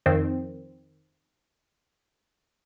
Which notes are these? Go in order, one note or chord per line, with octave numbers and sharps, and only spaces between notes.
F2 D#3 C4